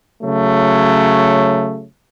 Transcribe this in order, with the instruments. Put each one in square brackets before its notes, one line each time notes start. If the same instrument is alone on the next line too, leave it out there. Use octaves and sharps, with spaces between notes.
[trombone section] C#3 F#3 A3